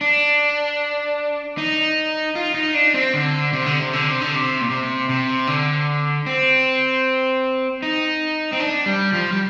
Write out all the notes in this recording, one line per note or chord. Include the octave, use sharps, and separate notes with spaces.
D4
D#4
F4
D#4
D4
C4
D3
C3
D3
C3
D3
C3
D3
C3
A#2
C3
C3
D3
C4
D#4
C4
D4
G3
F3
G3